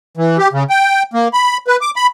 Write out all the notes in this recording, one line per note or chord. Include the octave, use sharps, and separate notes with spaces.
E3
G4
C#3
G5
A#3
B5
B4
D6
B5